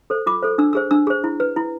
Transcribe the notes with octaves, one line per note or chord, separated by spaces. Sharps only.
A4 C5
F4 D6
A4 C5
D4 E6
G#4 C5 E6
D4 E6
G#4 C5
E4
B4
E4